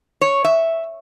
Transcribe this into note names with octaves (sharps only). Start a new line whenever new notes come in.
C#5
E5